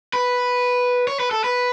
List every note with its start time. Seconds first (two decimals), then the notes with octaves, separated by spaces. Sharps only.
0.13 B4
1.07 C#5
1.20 B4
1.31 A4
1.44 B4